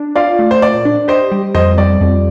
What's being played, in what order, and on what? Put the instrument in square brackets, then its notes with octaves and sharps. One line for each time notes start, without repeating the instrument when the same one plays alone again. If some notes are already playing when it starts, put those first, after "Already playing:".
Already playing: [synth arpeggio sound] D4
[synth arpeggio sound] F4 [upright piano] D5 F5
[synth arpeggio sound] A3
[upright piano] C5
[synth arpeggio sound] A#2 [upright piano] D5
[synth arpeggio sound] D4
[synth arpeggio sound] G4 [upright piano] C5 D#5
[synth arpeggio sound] G3
[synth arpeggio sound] F2 [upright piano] C5 D#5
[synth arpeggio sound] G3 [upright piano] D5
[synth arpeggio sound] F2